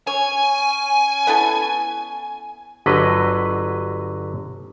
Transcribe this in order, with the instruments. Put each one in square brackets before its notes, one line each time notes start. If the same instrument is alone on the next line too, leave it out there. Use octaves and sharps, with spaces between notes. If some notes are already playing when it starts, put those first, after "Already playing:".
[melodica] C#4 [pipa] C#5 [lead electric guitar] G#5
[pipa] B3 E4 A4
[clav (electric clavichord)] G1 D3 F#3 B4 D#5